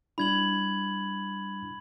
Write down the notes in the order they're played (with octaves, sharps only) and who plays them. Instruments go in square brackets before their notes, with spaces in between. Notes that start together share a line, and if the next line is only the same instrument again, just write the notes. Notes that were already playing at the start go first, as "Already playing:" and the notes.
[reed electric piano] G3 D4 E4 [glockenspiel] B5 G#6 F#7